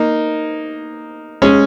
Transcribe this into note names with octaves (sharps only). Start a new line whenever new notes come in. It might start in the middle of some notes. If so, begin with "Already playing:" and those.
Already playing: A#3 D#4
G#3 C#4